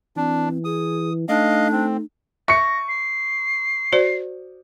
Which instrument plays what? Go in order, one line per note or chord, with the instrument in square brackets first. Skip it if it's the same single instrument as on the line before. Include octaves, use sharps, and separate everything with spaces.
[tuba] E3 [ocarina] C4 [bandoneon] D4
[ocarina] G#4 [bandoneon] D#6
[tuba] A3 [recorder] D4 [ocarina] D#4 [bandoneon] D#5 F5
[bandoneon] C4
[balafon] E5 [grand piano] C#6 C#7 [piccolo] A#6
[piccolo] C7
[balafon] F#4 C5 D5